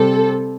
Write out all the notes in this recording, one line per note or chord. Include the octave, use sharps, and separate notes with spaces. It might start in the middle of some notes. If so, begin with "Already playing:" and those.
Already playing: C3 G3 C4 A4